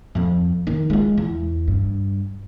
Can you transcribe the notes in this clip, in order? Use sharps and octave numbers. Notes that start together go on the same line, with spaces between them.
F2 C4
D#3
G#3 F4
E2
G2